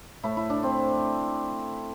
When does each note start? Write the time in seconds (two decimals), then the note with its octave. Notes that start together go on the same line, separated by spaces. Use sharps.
0.23 A2 A3 E4
0.37 E4
0.50 D4
0.63 C4